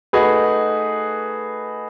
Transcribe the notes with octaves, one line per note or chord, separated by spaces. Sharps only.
A3 D#4 F#4 G#4 B4